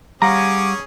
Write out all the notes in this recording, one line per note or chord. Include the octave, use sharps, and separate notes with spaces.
G3 C#4 G#4 C#5 F5 F#5 A#5 D6